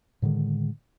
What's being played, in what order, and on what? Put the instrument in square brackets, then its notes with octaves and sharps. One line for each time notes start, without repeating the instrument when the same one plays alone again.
[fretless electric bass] A2 D3 D#3 G#3